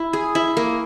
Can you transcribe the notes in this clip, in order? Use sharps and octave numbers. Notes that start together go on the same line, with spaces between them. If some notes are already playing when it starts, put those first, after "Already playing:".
Already playing: E4
G#4
E4
A#3